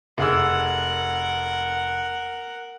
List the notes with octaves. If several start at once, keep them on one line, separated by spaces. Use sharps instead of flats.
F1 G#4 A#4 F#5 E6